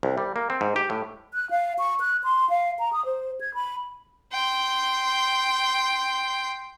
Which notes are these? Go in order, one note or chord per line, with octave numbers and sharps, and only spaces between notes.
C2
G3
A#3
C4
G#2
G4
A2
F#6
F5
C#6
F#6
C6
F5
A#5
D#6
C5
G#6
B5
G5 C6